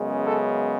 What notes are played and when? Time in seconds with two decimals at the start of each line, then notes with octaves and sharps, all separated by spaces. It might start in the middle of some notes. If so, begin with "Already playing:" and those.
Already playing: F#2 C#3 G#3 B3
0.25 A4